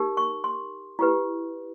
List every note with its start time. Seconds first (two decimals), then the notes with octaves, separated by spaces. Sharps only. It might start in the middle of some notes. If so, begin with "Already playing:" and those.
Already playing: D#4 G4 A#4
0.17 C#6
0.44 C6
0.99 E4 G4 B4